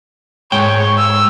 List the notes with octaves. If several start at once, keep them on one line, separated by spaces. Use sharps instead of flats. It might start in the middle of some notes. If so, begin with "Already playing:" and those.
G#2 C#5 G5
E6